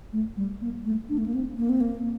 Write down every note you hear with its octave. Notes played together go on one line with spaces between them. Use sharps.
A3
G3
A#3
A3
D4
A3
A#3
C4
A#3
C4
A#3